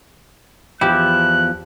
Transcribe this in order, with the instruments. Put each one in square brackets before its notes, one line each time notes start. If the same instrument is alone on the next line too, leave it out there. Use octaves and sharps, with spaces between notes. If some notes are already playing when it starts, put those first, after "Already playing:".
[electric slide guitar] E2 F3 E4 [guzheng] G4 [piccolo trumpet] F#6